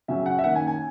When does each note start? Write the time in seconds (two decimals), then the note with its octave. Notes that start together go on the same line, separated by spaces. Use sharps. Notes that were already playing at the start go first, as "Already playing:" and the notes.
0.08 C#3 F#3 C#4 E5
0.26 F#5
0.39 E5
0.44 D#3 A#3 C#4 F#5
0.55 G#5
0.67 G#5